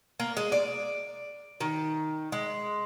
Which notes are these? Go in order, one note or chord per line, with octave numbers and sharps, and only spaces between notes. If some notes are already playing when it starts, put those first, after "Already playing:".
A#3
G#3
D5
D#3
G#3